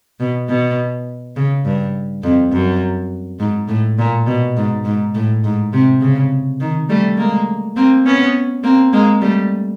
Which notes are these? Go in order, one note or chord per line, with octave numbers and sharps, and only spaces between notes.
B2
B2
C#3
G2
F2
F#2
G#2
A2
A#2
B2
G#2
G#2
A2
G#2
C3
C#3
D#3
G3 A3
G#3 A#3
A#3 C4
B3 C#4
A#3 C4
G#3 A#3
G3 A3